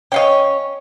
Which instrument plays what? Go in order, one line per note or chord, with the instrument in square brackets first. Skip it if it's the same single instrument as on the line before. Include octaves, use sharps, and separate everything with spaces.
[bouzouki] C#4 C#5 [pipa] D#5 F5 G5